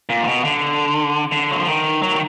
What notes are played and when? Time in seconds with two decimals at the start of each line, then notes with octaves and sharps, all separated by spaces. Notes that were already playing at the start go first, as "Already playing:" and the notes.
0.09 A#2
0.23 D3
0.27 B2
0.45 D3
1.32 D3
1.51 F#3
1.59 F3
1.67 D#3
2.02 F#3
2.11 D#3